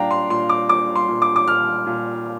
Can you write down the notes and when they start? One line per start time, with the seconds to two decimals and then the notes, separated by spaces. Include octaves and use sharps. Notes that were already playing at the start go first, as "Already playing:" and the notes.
Already playing: A#2 G3 D4 F5 G5 A#5
0.11 C6
0.30 A#2 C6
0.49 D6
0.69 A#2 D6
0.96 C6
1.08 A#2
1.22 D6
1.36 D6
1.47 A#2 F6
1.86 A#2